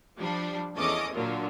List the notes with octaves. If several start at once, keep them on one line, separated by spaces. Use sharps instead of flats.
F3 G3 D4
E2 C#4 A4 D#5 D6 D#6
A#2 D3 F#3 F4 A#4